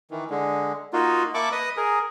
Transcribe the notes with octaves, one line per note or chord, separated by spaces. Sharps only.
D#3 E3
D3 G#3
A#3 D#4 F4 F#4
A#3 E5 A5 B5 C#6 D6
B4 D#5 D#6
G#4 A#4